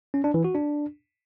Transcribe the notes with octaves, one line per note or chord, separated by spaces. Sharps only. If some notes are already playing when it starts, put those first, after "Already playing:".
C#4
D4
E3
F#4
D4